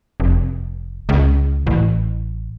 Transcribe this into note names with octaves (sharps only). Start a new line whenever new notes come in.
F1
C#2
A1